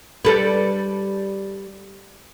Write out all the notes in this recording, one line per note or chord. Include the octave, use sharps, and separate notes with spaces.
G3 A4 B4